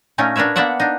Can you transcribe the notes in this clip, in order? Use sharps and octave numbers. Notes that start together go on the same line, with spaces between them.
A#2 A3 C#4 D#4 A#4
D4 A#4 B4 C#5 E5
A#3 B3 D4 D5 E5 F#5
D4 D#4